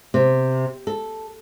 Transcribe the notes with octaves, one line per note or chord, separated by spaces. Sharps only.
C3
A4